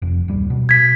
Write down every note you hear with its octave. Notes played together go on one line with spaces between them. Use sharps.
F1 F2
D1 G3
B2
G#6 B6